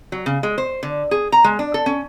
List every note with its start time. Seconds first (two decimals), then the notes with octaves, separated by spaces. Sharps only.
0.12 F#3
0.26 C#3
0.43 G#3
0.58 C5
0.83 D3
1.11 G#4
1.32 A#5
1.44 G#3
1.59 D4
1.74 A4
1.86 C#4